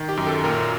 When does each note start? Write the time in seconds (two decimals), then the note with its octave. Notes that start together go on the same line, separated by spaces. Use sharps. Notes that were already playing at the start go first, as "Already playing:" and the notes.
Already playing: D#3
0.09 G4
0.17 F#2
0.27 A4
0.44 A#2 A#4